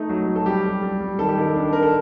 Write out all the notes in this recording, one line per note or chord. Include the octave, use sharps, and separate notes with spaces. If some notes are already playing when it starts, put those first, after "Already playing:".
Already playing: A3 D#4
F#3
F#3
A4
G3 G4
G3
G3
G3
D#3 A4
G4
D#3 A4
D4
D4 A#4
A4